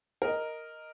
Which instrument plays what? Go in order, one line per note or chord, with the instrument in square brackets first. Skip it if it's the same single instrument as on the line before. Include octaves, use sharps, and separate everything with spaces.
[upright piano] A#4 D#5